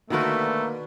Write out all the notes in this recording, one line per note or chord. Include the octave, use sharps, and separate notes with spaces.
B2 D3 D#3 A3 A#3 F#4 A#4 B4